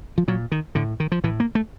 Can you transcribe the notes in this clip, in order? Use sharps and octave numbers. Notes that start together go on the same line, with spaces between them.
F3
A#2 F#3
D#3
A2 D3
D#3
F3
A2 E3
A#3
A3